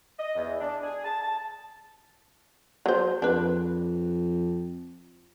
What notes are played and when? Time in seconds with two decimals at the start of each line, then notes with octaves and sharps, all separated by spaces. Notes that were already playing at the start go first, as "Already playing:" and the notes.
0.19 D#5
0.36 E2
0.60 D4
0.83 G#4
1.05 A5
1.22 A5
2.86 F#3 C5
3.22 F2 D4 B4